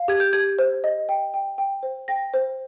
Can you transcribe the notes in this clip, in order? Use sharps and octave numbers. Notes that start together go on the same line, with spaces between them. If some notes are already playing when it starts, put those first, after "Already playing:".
Already playing: F5
G4 G#6
G6
G4 G#6
C5
D#5
G5
G5
G5
C5
G5 A#6
C5